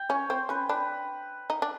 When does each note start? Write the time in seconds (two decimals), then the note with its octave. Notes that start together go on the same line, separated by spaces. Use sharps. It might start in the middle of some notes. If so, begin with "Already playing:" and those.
Already playing: G5
0.09 C#4 C#5
0.30 C4 C5
0.49 C#4 B4
0.69 D4 B4
1.50 D#4
1.62 D4